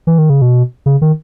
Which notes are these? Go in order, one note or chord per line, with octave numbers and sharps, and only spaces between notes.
E3
D#3
C#3
B2
C#3
D#3